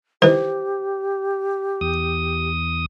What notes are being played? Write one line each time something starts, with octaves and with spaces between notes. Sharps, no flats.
D#3 E3 G4 C5
E2 D#6